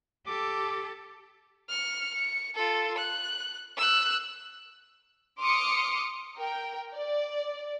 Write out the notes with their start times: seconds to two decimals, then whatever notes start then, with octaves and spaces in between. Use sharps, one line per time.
0.27 G4 A4 D6
1.70 F6 C#7
2.14 C#7
2.55 F4 A4
2.98 F#6
3.77 E6 F#6
5.40 C6 D6 D#6 F6 C#7
6.37 A#4 G5
6.95 D5